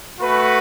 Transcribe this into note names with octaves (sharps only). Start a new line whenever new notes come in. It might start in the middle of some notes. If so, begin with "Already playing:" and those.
A3 F#4 B4